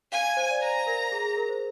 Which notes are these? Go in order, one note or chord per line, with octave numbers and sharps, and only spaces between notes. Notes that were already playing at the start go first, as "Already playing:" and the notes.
F5 G#5
C5
D5
C5 A#5
A#4
G#4
G#4
A#4
C5